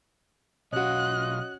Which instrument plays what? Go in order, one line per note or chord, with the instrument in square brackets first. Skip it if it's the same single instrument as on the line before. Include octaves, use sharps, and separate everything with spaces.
[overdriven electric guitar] B1 F4 [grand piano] C#4 F#4 [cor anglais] D#5 [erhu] F#6